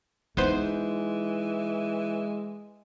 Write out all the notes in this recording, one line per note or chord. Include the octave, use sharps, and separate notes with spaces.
E3 G#3 B3 D#4 C5